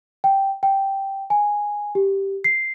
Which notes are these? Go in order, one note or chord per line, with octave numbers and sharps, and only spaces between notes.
G5
G5
G#5
G4
C7